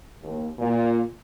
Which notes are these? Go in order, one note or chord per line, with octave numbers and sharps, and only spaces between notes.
D#2
A#2